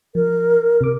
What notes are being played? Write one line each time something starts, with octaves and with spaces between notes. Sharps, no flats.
F3 A#4
C3 D6